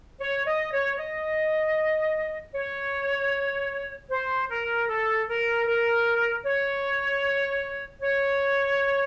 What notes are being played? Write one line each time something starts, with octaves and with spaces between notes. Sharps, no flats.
C#5
D#5
C#5
D#5
C#5
C5
A#4
A4
A#4
A#4
C#5
C#5